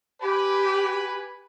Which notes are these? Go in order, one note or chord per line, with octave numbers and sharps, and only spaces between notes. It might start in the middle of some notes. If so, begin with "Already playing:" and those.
G4 B4 G#5 B5